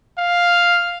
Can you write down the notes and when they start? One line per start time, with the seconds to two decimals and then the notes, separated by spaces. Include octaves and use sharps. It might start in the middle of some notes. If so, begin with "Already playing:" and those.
0.18 F5